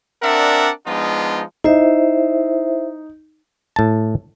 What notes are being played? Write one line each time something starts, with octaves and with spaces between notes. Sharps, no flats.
C4 D4 A#4 D5 E5 F#5
F3 G#3 B3 D4 D#4 F4
D#4 E4 C5 E5
A2 A5